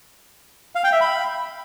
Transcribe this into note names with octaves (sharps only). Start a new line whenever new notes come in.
F5
G5
E5
B5